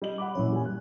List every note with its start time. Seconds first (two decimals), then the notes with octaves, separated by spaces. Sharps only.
0.02 G3 D#5 F#7
0.18 F#5 B5 D6
0.35 F#2 A#2 E3 C#5
0.52 G3 G#5
0.65 F#6